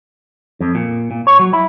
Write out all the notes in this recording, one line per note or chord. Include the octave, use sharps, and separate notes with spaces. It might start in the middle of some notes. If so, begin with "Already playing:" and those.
F2
A#2
A#2
C#5
F#3
E4